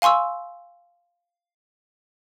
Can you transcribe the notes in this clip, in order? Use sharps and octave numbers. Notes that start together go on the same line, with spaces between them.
F5 G#5 C6 C#6 E6